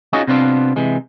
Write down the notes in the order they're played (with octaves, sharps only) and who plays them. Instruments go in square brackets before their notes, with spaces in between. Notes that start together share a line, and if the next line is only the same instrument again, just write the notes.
[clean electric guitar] C#4 D#4 F4 F#4 G#4 D#5
C3 B3 C4 D4 F4
C3 E3 G#3